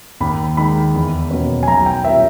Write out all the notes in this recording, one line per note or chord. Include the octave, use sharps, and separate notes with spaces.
D#2 B5
D#3 G#3 B5
E2
B2 A#3 C#4
G#5
B1 A#5
G5
A#2 G3 A#3 C#4 E5